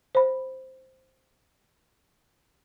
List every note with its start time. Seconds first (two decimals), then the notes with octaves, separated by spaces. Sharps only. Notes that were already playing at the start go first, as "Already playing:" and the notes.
0.15 C5 B5